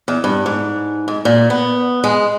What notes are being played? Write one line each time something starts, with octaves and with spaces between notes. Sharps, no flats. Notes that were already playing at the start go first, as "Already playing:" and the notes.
E2
G2
G#2
G#2
A#2
B3
G#3